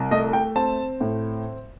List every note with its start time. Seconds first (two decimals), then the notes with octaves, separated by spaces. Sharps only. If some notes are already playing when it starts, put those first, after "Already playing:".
Already playing: C2
0.11 A3 D#5
0.33 G5
0.56 C4 A5
1.01 A2